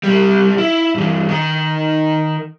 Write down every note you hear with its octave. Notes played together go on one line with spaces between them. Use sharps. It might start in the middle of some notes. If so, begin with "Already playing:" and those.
C2 G3
E4
G2 E3
D#3 D#4